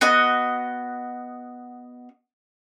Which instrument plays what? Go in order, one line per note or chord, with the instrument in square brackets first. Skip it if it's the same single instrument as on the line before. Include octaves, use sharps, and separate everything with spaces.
[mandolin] B3 F#4 D#5